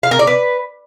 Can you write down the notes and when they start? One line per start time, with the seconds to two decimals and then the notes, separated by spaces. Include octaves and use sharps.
0.03 F5
0.11 A#4
0.19 D5
0.27 B4